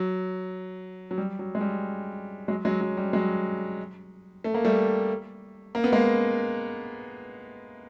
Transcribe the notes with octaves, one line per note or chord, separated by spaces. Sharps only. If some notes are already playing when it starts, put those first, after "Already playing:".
Already playing: F#3
F#3
G3
F#3
G#3
G3
F#3 G#3
F#3 G#3
F#3
G3
F#3 G#3
A3
A#3
G3 A3
A#3
B3
G#3 A#3